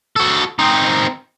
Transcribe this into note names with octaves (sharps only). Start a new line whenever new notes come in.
F#4 A4
C4 D#4